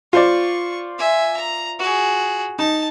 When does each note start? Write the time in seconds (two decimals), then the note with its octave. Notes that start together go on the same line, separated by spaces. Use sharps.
0.13 F4 C5 D5 C#6
0.99 E5 G#5
1.37 A#5
1.79 F#4 G#4
2.59 D#4 A5